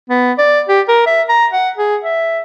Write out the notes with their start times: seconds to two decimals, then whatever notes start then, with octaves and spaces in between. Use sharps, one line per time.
0.10 B3
0.38 D5
0.69 G4
0.89 A#4
1.06 E5
1.29 A#5
1.53 F#5
1.77 G#4
2.04 E5